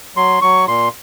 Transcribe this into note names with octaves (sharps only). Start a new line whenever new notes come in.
F#3 C6
F#3 C#6
A#2 C6